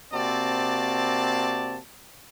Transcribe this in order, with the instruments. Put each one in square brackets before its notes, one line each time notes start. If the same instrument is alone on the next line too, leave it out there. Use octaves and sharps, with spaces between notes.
[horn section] C3 A#3 C4 F#4 D5 A5